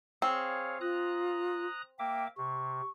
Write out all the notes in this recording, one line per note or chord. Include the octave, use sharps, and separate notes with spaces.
C4 G#4 C#5 F5
F4 A#5 D#6 F#6
A#3 E5 G5 D6
C3 C#6